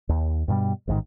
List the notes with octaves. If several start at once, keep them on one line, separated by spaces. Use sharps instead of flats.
D#2
G2 B2 F#3 G3
A1 G#2 B2 D#3